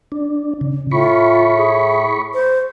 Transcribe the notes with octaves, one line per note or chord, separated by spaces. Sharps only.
D4
C#3
A2 F4 B5 C#6
G#4
C5